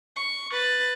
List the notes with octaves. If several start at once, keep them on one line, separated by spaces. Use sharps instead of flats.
C#6
B4 A6